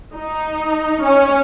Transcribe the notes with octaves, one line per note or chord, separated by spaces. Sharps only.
D#4
C#4